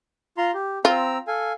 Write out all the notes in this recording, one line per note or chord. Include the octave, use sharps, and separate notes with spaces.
F4 A#5 C6
G4
C4 F4 A#5 E6
A4 F5 G#5